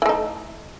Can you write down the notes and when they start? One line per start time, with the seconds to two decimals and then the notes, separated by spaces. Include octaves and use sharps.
0.02 E3
0.06 A3
0.09 D#4